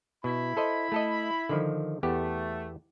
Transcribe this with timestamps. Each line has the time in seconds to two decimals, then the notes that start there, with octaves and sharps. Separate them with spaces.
0.24 B2 E4 B5
0.57 A4 C5 D#5
0.92 A3 A4 D#5
1.49 D3 D#3 F3
2.03 E2 A3 B3 G4